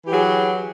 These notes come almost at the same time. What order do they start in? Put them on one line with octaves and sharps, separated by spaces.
E3 G4 F#3 G#4